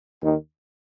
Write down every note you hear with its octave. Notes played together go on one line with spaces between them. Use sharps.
D#2 D#3